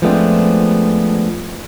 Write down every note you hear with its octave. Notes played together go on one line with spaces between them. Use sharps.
F3 G#3 A3 B3 C4 D4